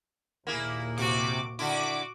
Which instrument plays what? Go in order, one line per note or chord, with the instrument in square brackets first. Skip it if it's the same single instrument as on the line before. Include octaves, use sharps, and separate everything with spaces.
[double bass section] D#2 A#2 [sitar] A#3 E4 G#4
[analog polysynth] C3 D6 [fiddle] F#4
[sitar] D3 E4 [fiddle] F#4 [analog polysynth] D6